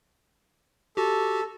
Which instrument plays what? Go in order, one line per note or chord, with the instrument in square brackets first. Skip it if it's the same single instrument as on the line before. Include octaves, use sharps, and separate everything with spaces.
[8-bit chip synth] F#4 G4 [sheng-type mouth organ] A4